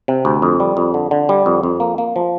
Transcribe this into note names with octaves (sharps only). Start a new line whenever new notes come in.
C3
D2
F2
G3
F2
D3
D3
G3
F2
F2
A#3
A#3
F3